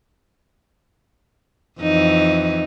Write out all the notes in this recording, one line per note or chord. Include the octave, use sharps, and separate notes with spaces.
F2 E3 D#4